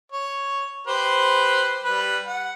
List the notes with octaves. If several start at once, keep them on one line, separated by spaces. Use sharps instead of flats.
C#5
G4 B4 C5
G3 B4
F#5